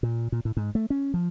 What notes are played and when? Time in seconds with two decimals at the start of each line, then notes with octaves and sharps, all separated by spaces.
0.03 A#2
0.32 A#2
0.45 A2
0.57 G#2
0.75 A3
0.90 C#4
1.14 F3